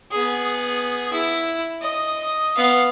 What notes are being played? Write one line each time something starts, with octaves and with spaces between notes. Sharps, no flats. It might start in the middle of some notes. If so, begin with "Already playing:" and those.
B3 G#4
E4
D#5
B3 F5